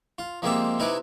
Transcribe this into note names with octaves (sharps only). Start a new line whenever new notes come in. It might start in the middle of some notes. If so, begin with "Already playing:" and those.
F4
F3 G#3 A#3 C4 G4 E5
C3 D#4 E4 B4 G#5 D6